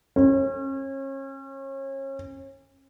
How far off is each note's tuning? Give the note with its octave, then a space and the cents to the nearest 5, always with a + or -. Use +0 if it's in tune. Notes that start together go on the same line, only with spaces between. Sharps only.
C#4 -35